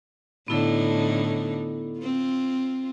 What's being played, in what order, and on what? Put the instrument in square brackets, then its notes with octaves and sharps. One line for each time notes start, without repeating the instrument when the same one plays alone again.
[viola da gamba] A2 D3 D#4 [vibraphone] B3 E4 A4
[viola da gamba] C4 F4